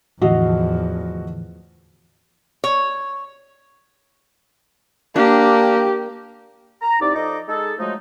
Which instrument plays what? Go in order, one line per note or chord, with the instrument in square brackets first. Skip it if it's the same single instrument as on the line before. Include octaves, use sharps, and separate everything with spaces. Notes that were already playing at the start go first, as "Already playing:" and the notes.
[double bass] E2 F3 [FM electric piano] A2 D3 E3 [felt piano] F#4 D#5
[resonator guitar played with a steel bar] C#5
[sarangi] A#3 [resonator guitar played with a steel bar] D4 [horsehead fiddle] G4
[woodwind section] A#5
C2 D#4 D5
F3 D#4 A4 D5 D#5 D6
G#3 D#4 G#4 A4
F3 F#3 G#3 A3 D#4